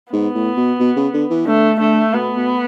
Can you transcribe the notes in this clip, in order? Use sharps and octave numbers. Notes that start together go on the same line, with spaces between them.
G#2 B3
A2
B2
B2
C#3
D3
E3
D3 A3
D3 A3
B2 B3
B2